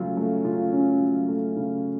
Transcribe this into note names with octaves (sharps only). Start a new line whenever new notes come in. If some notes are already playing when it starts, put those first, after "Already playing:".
Already playing: C#3 F#3 A3 C#4 F4
A3
C#3 F4
C#4
F#3
A3
C#3